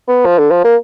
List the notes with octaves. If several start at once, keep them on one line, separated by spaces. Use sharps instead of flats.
B3
F3
D3
F3
A#3